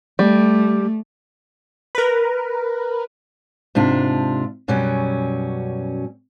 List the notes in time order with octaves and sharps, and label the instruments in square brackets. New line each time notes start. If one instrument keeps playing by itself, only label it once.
[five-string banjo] G3 [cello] A3
[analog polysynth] A#4 B4
[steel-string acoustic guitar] G#2 C3 D4 F4
F#2 B2 F#3 G3 C#4